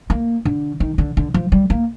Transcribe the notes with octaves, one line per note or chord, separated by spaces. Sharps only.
A#3
D3
D#3
D3
D3
F3
G3
A#3